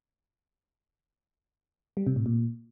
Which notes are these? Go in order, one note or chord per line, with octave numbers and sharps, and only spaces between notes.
G3
C3
A2
A#2